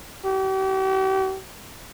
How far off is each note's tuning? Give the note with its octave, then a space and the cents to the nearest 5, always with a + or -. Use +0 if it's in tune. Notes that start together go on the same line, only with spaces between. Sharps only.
G4 -40